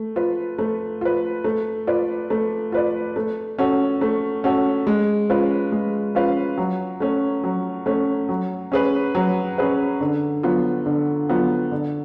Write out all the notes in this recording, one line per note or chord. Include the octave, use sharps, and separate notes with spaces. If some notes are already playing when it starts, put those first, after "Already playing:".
Already playing: A3
F4 B4
A3
F4 B4
A3
F4 B4 D5
A3
F4 B4 D5
A3
C#4 F#4 A4
A3
C#4 F#4 A4
G#3
C#4 F4 B4 F5
G#3
C#4 F4 B4 F5
F#3
A3 C#4
F#3
A3 C#4
F#3
C#4 G#4 B4
F#3
C#4 G#4 B4
D3
F#3 B3 F4
D3
F#3 B3 F4
D3